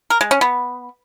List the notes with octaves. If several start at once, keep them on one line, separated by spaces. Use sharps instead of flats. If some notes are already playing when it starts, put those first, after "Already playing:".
A#4
G#3
C#4
B3